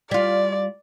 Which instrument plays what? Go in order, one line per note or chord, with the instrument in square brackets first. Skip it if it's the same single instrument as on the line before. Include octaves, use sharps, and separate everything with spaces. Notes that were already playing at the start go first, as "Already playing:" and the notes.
[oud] G3 F4 [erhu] D5